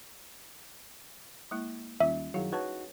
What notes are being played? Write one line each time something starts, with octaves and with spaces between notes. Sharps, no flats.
G#3 A#3 E4
D#2 G3 C#4 F4 E5
F#2 D#3 F#3 E4 G#4 F5
D#4 F#4 B4 C#5 A5